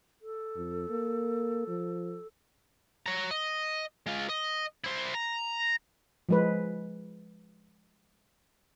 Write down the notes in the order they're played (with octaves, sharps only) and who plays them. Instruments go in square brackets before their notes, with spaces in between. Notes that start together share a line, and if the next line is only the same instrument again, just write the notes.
[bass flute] A4
[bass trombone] F2
A#3
F3
[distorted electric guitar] C#5 A#5
D#5
G#3 F4
D#5
E4 C5
A#5
[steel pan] F3 G#3 B4